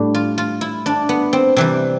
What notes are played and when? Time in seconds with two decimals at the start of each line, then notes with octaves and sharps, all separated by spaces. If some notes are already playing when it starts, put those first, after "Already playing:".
Already playing: A2 G3 D4
0.15 F4
0.38 F4
0.61 E4
0.86 D4
1.09 B3
1.33 C4
1.56 C3 E3 G3 C4